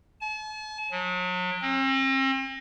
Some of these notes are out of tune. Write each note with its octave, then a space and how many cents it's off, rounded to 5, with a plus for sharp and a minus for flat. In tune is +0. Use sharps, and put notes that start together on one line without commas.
A5 -45
F#3 -35
C4 +40